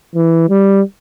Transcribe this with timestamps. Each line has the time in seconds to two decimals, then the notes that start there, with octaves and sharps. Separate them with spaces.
0.15 E3
0.50 G3